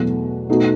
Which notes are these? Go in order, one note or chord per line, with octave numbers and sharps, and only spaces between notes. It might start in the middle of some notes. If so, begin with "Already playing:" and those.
Already playing: E2 B2 F#3 A3
B2 A3 D#4 F#4